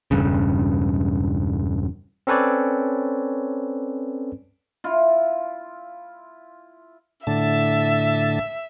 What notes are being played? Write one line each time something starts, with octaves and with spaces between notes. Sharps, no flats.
E1 G2 C#3
C4 C#4 A4 B4 C#5 D5
E4 F4
A2 D3 E5 A5